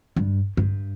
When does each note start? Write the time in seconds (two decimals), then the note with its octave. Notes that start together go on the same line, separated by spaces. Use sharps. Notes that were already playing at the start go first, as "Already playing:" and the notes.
0.16 G2
0.57 G2